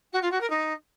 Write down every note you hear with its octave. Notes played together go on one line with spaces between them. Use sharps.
F#4
F4
F#4
A#4
D#4